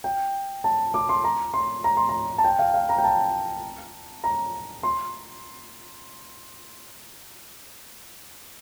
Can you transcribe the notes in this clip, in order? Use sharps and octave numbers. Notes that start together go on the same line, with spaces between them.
G5
A5
D6
C6
A#5
C6
A#5
C6
A#5
A5
G5
F5
F5
A#5
G5
A5
A#5
C6